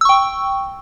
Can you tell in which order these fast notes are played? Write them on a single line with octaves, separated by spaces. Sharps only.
E6 C#6 G5